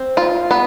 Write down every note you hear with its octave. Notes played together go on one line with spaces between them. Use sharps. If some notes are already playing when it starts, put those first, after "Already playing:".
Already playing: C4
F4
B3